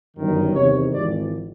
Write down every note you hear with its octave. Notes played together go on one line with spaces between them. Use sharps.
G1 F#2 D#3
E2 C3 D#3 C#5
G#1 G#2 E3 D5